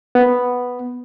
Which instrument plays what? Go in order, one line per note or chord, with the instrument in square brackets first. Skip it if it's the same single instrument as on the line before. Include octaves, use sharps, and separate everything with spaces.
[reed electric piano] B3